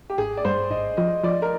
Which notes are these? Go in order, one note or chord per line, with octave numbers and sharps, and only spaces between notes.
G4
G#1 G#4
D5
G2 C5
G#1 D#5
F3 D#5
F3 D5
A#4